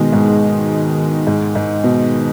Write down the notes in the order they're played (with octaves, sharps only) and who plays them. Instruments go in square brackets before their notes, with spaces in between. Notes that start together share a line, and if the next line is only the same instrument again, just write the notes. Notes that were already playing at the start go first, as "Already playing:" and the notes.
Already playing: [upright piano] B2 [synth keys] D#3 G#3
[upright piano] G#2
G#2
G#2
B2